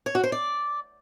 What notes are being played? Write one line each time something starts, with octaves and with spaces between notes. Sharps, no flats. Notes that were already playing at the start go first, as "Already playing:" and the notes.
C#5
F#4
C5
D5